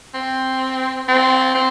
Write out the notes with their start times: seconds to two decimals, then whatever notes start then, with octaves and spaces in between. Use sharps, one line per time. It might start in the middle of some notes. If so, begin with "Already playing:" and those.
0.14 C4
1.08 C4
1.55 C4